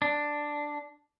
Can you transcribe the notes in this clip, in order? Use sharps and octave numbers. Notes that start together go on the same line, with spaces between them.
D4